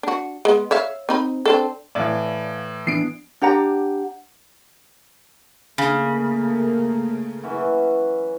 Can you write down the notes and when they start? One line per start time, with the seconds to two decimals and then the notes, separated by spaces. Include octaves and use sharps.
0.03 D4 F#4
0.45 G#3 B3
0.71 C#5 E5 F5
1.09 C4 D#4 B5
1.46 C4 D4 A4
1.95 A2 E3 D5 F5
2.87 E3 B3 D4 C7 D7
3.41 D4 G4 F#5 A#5
5.78 C#3 A3 A#3
7.44 E3 F#3 C#4